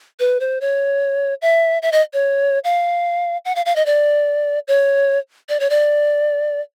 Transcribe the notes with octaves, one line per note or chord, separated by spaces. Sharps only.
B4
C5
C#5
E5
E5
D#5
C#5
F5
F#5
F5
F5
D#5
D5
C#5
D5
C#5
D5